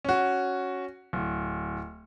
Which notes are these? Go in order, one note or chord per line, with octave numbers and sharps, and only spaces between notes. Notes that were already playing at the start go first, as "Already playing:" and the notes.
C#4 F#4
D1